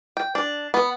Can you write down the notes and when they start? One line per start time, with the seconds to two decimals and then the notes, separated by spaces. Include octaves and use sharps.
0.17 G5
0.35 D4
0.74 B3